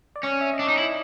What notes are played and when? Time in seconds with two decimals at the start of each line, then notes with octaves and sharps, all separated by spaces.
0.16 D5
0.23 C#4 C#5
0.41 E5
0.54 D#5
0.59 D4
0.65 D#4 D5
0.78 E4 D#5